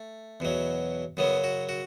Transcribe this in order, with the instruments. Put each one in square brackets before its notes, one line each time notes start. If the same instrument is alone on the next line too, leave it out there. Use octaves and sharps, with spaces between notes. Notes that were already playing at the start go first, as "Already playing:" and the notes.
Already playing: [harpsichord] A3
E2 B2 F#3
F#2 C#3 F#3 B3
F#4
F#4